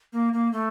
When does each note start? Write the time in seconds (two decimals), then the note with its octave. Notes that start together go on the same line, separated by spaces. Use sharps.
0.13 A#3
0.33 A#3
0.52 A3